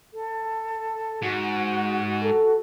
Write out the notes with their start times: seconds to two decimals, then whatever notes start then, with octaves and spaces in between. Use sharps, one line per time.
0.13 A4
1.23 G#2 F#4
2.23 A4